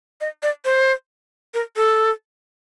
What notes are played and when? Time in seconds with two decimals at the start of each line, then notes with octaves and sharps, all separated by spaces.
0.21 D#5
0.43 D5
0.65 C5
1.54 A#4
1.77 A4